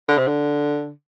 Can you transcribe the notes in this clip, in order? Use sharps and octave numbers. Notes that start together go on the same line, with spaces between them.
D3
C3
D3